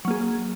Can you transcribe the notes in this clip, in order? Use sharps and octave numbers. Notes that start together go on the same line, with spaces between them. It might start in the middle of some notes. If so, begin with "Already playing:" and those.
F#3 A#3 G#4